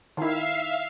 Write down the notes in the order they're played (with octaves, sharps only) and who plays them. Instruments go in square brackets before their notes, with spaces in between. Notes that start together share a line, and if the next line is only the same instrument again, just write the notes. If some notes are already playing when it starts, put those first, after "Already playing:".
[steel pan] D#3 E4 [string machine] E5 F5 C7